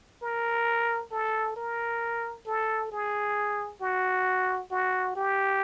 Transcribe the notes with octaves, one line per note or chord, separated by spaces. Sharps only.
A#4
A4
A#4
A4
G#4
F#4
F#4
G4